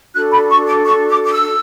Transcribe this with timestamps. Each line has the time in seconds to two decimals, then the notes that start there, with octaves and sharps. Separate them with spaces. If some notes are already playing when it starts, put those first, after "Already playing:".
0.14 D4 F#4 A4 F#6
0.32 B5
0.49 C#6
0.67 D6
0.84 C#6
1.08 D6
1.24 D6
1.31 E6